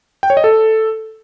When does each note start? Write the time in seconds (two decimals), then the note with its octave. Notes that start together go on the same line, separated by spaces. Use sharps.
0.23 G5
0.30 C#5
0.37 D#5
0.44 A4